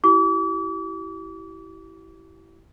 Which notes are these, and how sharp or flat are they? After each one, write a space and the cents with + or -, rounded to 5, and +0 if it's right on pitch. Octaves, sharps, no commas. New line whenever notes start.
E4 +0 G4 -35 D6 -40